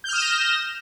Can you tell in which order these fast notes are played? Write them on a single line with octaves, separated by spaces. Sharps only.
G6 F6 D#6 E7 A#6